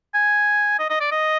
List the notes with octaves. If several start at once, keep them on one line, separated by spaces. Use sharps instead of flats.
G#5
D#5
D#5
D5
D#5